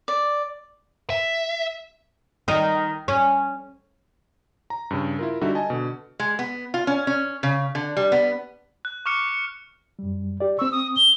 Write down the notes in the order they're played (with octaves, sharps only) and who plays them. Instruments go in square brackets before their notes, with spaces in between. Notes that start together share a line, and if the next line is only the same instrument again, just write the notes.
[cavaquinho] D5
[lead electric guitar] E5
[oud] D#3 D#4
C#4
[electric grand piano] A#5
G2 C#3
E4 F4 A#4
D3 G3 D#4 F#4 E5
D#5 G#5 A5
B2 D3
[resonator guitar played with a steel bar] G#3
B3
F4
C#4
C#4
C#3
D3
G3
B3
[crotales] F#6
C#6 D6 F6 C#7
C#7
[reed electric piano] F#2 G3
G4 D5
[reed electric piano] C4 C#6 [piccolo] E6
[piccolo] D#6
G7